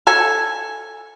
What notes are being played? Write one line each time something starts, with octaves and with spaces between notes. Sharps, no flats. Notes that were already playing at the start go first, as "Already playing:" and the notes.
A4 G#5